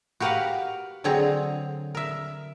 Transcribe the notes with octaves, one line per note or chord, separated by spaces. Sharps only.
F#4 G4 A#4 B4 F5 F#5
D3 F#3 C4 G#4 A#5
A#4 E5